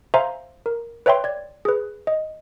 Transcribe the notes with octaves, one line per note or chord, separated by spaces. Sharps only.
C5 E5 F5 G#5 A#5 C6
A#4
B4 C#5 E5 G5 C6
D5 G#6
G#4 B4
D#5